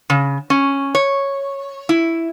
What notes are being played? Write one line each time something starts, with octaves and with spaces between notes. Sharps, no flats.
C#3
C#4
C#5
E4